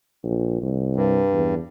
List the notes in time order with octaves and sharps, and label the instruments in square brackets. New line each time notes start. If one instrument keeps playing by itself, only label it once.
[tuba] A#1
C2
[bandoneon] G2
[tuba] E2